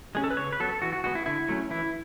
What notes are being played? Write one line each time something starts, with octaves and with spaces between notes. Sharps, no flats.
G#3 C#4 G#4
A4
B4
C#3 C#5
B4
F#3 B3 A4
E3 F#4
F#4
G#3 B3 F#4
E4
D3 E4
F#3 A3 C#4
E3 E4